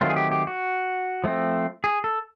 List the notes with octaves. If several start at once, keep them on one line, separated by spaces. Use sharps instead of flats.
D#3 F#3 A3 C4 F4
G#4
G4
G4
F#4
F3 A3 C4
G#4
A4